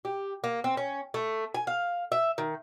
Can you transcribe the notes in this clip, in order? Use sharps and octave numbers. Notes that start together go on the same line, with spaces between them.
G4
A#3
C4
C#4
A3
G#5
F5
E5
D#3